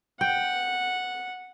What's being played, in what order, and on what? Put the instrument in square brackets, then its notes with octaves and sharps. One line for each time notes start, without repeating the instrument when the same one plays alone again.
[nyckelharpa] F#5 [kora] G5